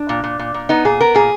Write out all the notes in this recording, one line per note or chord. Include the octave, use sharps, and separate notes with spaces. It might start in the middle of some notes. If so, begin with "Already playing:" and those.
Already playing: D4
A#2
A#2
A#2
A#2
B3 D#4
A#2 G#4
B3 A#4
A#2 G#4